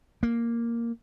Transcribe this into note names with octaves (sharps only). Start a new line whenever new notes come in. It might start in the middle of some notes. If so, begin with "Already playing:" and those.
A#3